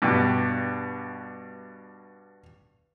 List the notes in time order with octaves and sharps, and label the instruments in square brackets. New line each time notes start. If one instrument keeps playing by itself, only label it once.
[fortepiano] G2 B2